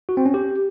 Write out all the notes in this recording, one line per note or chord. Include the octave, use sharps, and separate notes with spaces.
F#4
C4
C#4
G4